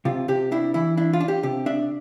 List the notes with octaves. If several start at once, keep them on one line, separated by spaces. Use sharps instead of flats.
C3 F4
C3 G4
D4 E4
E3 E4
D4 E4
F4
D4
G4
C3 G4
D4 E5